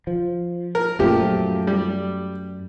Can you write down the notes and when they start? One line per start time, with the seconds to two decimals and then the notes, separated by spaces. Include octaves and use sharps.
0.07 F3
0.75 A#4
0.99 F#2 A#2 F3 A3 G4
1.67 G3